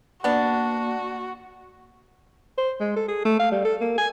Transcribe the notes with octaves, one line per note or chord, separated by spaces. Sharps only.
A#3 B3 D4 F#4 D5 F#5
C5
G#3
A4
G#4
A3
F5
G3
A4
A#3
G#5